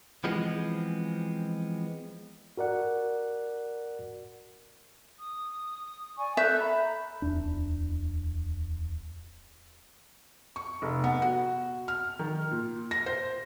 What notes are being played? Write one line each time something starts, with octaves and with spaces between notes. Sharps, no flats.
E3 F3 G#3 B3 C4
F#4 A#4 D5 F#5
D#6
D5 G#5 C#6
A4 E5 F#6 G6
A#5 B5
D1 E2 D4
C#6
F1
B3
F#4
F6
D#3
A#2
A#6
C5